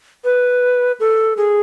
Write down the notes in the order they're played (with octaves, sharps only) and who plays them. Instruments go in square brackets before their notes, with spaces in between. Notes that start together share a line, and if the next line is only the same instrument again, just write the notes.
[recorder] B4
A4
G#4